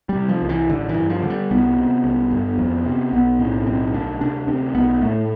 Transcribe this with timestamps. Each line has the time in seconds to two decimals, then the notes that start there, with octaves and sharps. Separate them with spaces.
0.09 G3
0.15 C3
0.29 F3
0.42 C2
0.49 E3
0.69 A1 D3
0.89 E3
0.96 G2
1.10 F3
1.23 D3
1.30 G3
1.51 C2 B3
1.78 C3
2.04 C2
2.31 G1
2.58 F2
2.86 C3
3.12 B1 B3
3.39 A2 C4
3.66 B1 C4
3.94 D2 D4
4.21 C3 D4
4.48 D2 C4
4.74 B1 B3
5.02 A2 A3